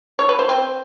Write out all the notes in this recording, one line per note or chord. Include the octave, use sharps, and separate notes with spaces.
C#5
B4
C5
C4